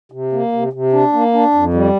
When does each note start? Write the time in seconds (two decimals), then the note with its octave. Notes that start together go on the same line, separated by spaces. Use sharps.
0.12 C3
0.33 A#3
0.52 C3
0.73 C3
0.93 D4
1.13 A#3
1.34 D4
1.54 F2
1.74 G3